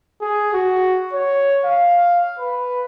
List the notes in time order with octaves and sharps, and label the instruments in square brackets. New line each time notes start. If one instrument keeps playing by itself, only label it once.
[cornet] G#4
F#4
C#5
F5
B4